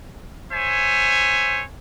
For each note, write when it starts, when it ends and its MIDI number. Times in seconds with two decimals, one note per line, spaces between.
0.52 1.62 72
0.52 1.62 73
0.52 1.62 76
0.52 1.62 80